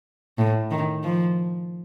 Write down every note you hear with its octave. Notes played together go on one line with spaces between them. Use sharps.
A2
D#3
F3